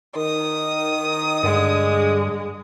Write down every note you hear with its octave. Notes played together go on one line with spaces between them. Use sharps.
D#3 D#6
G2 D3 G#3